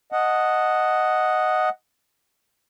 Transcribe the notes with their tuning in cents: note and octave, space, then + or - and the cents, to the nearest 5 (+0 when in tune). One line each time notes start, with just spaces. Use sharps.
D#5 +0 F#5 +0 A5 +0